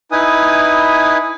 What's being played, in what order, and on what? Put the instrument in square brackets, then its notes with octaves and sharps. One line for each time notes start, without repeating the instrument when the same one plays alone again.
[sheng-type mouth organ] D#4 E4 B4 G#5 D#6